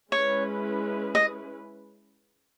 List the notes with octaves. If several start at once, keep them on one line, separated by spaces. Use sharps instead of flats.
G#3 C#4 E4 B4 C#5
D#5